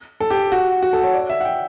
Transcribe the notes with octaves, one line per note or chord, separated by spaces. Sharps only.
A4
G4
F#4
F#4
A4
C#5
D5
E5
F#5
G5